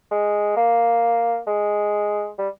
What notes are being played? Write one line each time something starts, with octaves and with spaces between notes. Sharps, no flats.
G#3
A#3
G#3
G3